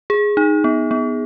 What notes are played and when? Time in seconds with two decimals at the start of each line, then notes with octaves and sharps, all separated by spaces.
0.10 G#4
0.37 D#4
0.64 B3
0.91 B3